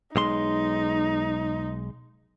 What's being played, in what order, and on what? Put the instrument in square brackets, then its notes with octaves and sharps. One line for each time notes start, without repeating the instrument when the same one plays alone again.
[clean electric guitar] B1 G#3 C6 [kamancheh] D#4